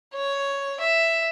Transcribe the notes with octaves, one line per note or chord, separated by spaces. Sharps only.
C#5
E5